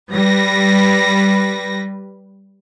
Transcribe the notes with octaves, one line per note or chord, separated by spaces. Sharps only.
G3 B4 A#6